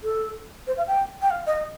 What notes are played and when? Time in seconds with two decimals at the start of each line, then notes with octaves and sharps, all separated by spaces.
0.03 A4
0.67 C5
0.77 F5
0.88 G5
1.22 G5
1.31 F5
1.47 D#5